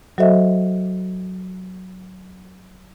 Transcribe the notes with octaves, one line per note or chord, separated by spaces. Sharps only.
F#3 F#4 A4 C5 D#5 E5